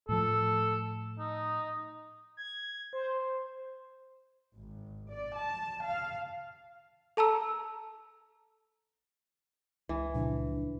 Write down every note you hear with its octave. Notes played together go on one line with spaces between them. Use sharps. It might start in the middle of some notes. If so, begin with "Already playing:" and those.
A2 F3 A4
D#4
G#6
C5
G#1
D5
A5
F5
A4 A5 A#5 E6
C#2 E3
A#2 C#3 F3 D4